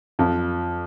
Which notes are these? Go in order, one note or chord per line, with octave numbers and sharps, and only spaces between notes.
F2